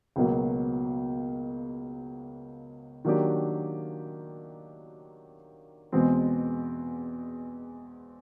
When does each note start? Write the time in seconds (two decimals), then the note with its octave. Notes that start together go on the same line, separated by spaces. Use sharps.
0.16 C#2 B2 F#3 A#3
3.05 D#3 F#3 A#3 D4 G4
5.92 E2 B2 G#3 C4